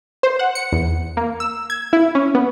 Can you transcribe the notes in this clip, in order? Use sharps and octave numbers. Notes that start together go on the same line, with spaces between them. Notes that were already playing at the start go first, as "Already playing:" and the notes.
C5
F#5
C#7
E2
A#3
E6
G#6
E4
C#4
B3